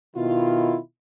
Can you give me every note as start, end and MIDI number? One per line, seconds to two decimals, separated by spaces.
0.16 0.79 47
0.16 0.79 51
0.16 0.79 64
0.16 0.79 65